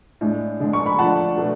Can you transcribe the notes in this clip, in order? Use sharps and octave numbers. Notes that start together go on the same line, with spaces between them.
A2 G#3 D4
D3 G#3 D4
C#6
B5
F3 A3 D4 F#5 A5
B2 A3 D4